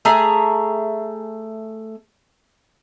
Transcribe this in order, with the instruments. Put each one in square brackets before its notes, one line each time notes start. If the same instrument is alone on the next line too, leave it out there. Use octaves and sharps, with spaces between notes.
[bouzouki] A3 G#4 E5 A#5